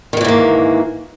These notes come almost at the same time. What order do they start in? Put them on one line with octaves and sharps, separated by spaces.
D#3 G#3 E3 G#2 A#3